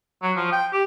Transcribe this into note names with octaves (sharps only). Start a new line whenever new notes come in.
F#3
F3
G5
G4